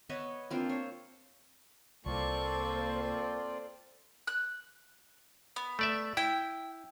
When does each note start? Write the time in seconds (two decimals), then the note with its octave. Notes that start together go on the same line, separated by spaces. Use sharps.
0.09 B3 C#5 D#5 E5
0.51 A#3 C4 D4 F4
0.69 C5 C#5
2.06 C2 A#3 C4 F4 A4 C5 D5 C#6
4.27 F#6
5.56 B3
5.79 A3 D5 E5
6.17 E4 G5